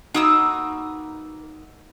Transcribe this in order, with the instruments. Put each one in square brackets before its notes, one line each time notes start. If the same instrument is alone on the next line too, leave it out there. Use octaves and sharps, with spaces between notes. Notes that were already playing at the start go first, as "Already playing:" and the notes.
[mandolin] A#3 D#6 E6 [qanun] D#4 F#4 B4